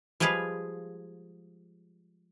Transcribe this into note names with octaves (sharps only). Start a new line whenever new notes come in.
F3 G3 G#3 G#4 B4 F5